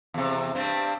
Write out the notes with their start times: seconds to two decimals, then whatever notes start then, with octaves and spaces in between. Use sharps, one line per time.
0.14 E2 C3
0.55 G2 G3 C4